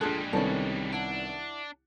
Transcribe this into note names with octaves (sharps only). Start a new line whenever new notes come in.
A#1 G3 G#3 D4 F4 G#4 A4 F#6
C2 D#3 B3 C#4 A4 D5
D4 E4 F#5